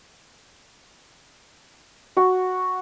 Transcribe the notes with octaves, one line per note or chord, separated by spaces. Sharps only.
F#4